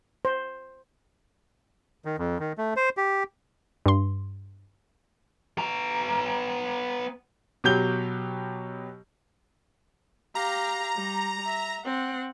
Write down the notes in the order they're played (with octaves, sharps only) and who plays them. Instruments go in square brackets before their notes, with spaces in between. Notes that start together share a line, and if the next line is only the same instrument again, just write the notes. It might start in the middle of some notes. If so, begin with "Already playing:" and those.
[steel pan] C5
[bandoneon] D#3
F2
D#3
A3
C5
G4
[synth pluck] G2 C6
[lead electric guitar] B3 A#5
[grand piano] B2 F#3 G4 G6 G7
[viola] G4 F5 [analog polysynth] A#5
[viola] G3
E5
C4 F#5